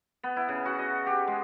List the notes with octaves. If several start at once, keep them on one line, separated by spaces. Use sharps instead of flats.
B3
E4
C#3
F#4
D#5
G4
G#3